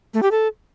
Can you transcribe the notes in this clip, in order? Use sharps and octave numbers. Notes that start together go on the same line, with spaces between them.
A3
G4
A4